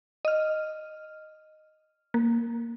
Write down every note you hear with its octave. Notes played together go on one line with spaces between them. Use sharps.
D#5 F6
A#3